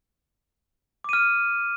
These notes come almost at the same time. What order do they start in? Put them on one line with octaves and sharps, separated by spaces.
D6 D#7 F6